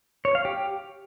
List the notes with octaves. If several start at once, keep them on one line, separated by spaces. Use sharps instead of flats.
C#5
F5
G4